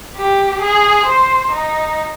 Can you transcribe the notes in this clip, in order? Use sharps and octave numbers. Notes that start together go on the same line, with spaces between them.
G4
G#4
C5
D#4